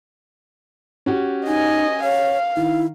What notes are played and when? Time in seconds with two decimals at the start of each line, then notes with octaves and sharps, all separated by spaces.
1.06 C#4 F#4 G4
1.47 D#4 D#5 G#5
2.03 C#5 F5
2.57 D#3 E4